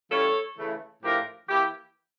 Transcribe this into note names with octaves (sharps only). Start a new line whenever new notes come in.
E3 G3 C#4 F4 A4 C#5
C#3 E3 A3
A2 F3 A3 D4 F4 G4 A#4
E3 A#3 E4 G4